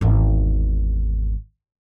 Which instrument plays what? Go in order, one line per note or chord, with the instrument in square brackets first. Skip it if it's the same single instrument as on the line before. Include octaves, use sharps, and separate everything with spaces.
[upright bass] G#1 E2